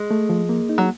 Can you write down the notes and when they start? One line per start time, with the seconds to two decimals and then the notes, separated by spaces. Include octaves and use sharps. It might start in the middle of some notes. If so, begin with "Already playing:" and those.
Already playing: G#3
0.11 A3
0.29 F3
0.49 A#3
0.69 D#4
0.78 F#3